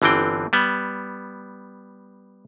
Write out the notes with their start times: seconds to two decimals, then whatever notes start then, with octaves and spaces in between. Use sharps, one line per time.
0.02 G1 D3 E3 C4 G5
0.53 G3 B3